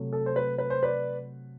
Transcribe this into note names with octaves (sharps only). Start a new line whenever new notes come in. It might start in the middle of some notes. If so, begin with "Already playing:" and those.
Already playing: C3 F#3 A3
A4
C5
B4
B4
C5
B4 D5